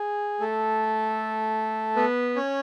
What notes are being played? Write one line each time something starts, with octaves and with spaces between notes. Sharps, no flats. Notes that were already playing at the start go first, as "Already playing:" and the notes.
Already playing: G#4
A3 A4
B3 B4
C#4 C#5